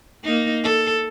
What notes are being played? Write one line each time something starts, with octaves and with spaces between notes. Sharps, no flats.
A#3 D#4
A4